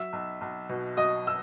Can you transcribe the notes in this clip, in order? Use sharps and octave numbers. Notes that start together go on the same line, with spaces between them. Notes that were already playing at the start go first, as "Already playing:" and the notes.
Already playing: F#3 E5 E6
B1
B1
B2
F#3 D#5 D#6
E6